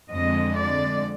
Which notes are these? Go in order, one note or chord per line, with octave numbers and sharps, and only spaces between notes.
F2 D3 G#3 D#5
D5